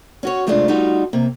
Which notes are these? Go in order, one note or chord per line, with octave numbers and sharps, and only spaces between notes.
C#4 F#4 C#5
C3 G#3 A3 C4 D4 F4
G3 D#4 F4 F#4 A4
C3 A#3